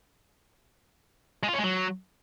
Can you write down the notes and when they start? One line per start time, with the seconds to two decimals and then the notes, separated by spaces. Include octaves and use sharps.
1.43 G#3
1.48 F4
1.53 C#4
1.59 G#3
1.64 F#3